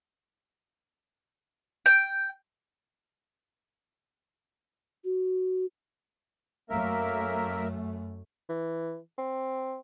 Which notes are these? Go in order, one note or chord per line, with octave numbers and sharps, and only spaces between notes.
G5
F#4
F#2 A3 A#3 A#4 E5
E3
C4